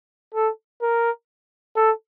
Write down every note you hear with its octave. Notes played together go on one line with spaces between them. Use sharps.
A4
A#4
A4